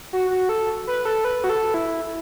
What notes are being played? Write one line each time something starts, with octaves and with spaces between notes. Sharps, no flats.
F#4
F#4
A4
B4
A4
B4
F#4
A4
E4